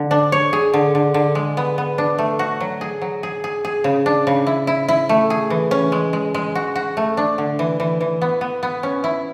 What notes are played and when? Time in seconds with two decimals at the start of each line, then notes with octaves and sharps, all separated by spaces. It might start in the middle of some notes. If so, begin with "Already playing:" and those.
Already playing: D3
0.11 D4
0.32 C#5
0.53 G#4
0.74 D3
0.95 D3
1.14 D3
1.35 G#3
1.57 B3
1.78 B3
1.98 D4
2.18 A3
2.39 F#4
2.60 F#3
2.81 G#4
3.02 F#3
3.23 G#4
3.44 G#4
3.65 G#4
3.84 C#3
4.06 D4
4.27 C#3
4.47 E4
4.67 E4
4.88 E4
5.09 A3
5.30 G#4
5.50 E3
5.71 C#4
5.92 G#3
6.13 G#3
6.34 G#3
6.55 F#4
6.76 F#4
6.97 A3
7.17 D4
7.38 D3
7.59 E3
7.80 E3
8.01 E3
8.22 B3
8.41 B3
8.63 B3
8.83 C#4
9.04 E4